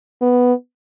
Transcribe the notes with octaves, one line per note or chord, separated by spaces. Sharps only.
B3